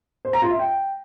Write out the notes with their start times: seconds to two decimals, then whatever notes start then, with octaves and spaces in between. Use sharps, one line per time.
0.25 C5
0.33 A#5
0.42 F4
0.51 E5
0.59 G5